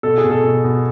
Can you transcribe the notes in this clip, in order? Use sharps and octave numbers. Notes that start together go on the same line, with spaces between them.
B2 A4
G#4
B2
A4
B2
B2